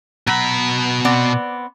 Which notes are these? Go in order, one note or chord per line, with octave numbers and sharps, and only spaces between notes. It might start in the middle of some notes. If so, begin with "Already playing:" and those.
B2 F#3 B5
B3 C4 D5